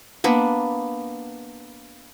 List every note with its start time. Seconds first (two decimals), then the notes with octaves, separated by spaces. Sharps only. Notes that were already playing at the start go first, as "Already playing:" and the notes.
0.24 A#3 B3 D4